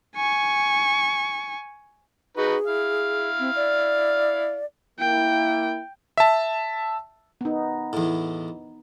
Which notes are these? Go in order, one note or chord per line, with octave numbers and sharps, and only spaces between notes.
G#5 C#6
D#4 F#4 G#4 B4
E4 F5
C4
D5
A#3 E4 G5
E5 A5
B3 D#4
E2 A2